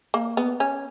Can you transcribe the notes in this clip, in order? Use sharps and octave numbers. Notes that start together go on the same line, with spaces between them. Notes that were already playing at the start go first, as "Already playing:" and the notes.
A#3
B3
C#4